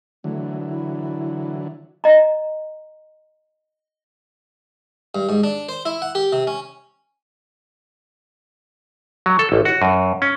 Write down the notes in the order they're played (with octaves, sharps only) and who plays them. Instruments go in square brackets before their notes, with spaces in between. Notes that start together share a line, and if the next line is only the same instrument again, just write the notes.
[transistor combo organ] D3 E3 F#3 [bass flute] A3
[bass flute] E4
[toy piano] D#5 A#5
[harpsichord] G2
G#2
D4
C5
E4
F#5
G4
C3
C#4
[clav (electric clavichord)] F#3
A4
A1
F#4
F#2
C#4